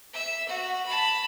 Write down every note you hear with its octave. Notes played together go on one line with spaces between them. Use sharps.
E5
F#4
A5 B5